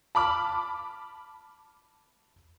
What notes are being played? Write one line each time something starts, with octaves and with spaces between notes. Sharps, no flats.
A5 B5 D6 F6